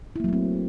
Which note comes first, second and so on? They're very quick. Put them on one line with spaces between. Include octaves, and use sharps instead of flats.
E4 A#3 F#3 A3 C4